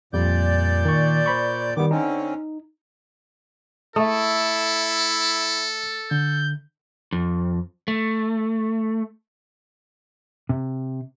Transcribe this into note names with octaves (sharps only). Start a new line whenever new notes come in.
F2 A#2 G3 D5 G6
D#3 C#6
C5 B5 C#6
D#3 G3 B3 D6
D3 C4 C#4 D#4
A3 E4 A4 E5 D#6
D3 G6
F2
A3
C3